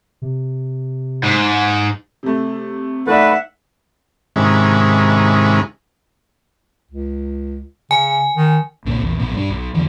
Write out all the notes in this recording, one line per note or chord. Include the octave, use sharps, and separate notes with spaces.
C3
G#2
C3 A3
A3 D#4 B4 D5 E5 F#5
G#2 C3 D#3 G#3 C#4 E4
C#2
C#3 G#5
D#3
B1 A#2 C#3
A#1 E2
A#1 B2 B3
G2 D4
B1
F2 A2 D3 E3